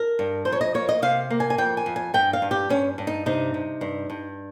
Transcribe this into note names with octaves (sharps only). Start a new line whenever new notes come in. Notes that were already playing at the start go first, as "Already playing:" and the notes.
Already playing: A#4
G2
F2 C5
C#5
D#5
A#3 C#5
D#5
C3 F5
A#3
G#5
G#5
F2 G5
G#5
F2
G#5
G2 G5
F5
G2
G4
G2 C#4
G2
D#4
C3 D#4
C3
G2
G2